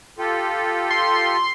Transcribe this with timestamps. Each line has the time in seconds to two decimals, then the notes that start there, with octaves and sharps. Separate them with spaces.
0.18 F4 G4 A4
0.90 C6